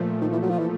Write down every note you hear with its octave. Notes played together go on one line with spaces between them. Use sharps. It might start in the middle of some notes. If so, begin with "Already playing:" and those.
Already playing: A#2 F3 A3
D#3
E3
F#3
F3
E3